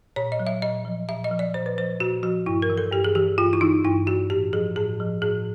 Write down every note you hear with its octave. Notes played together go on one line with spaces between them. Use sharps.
A#2 C#5
D#5
F#3
E5
A#2 D#5
F3
A#2 E5
D#5
F3
D5
A#2 C5
B4
F3 C5
A#2 F#4
F3 F#4
G2 E4
A#4
E3
A4
G2 G4
G#4
E3 G4
G2 F4
E4
E3 D#4
G2 E4
E3 F#4
A2 G4
F3 G#4
A2 G#4
F3
A2 G#4